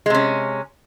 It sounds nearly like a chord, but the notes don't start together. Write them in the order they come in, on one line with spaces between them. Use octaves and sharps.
G#3 C3 C#4